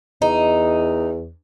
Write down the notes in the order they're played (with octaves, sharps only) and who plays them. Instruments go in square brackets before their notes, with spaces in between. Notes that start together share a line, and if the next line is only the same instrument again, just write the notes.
[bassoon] E2 [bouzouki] D#4